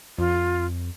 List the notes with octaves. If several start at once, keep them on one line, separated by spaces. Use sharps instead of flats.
F2 F4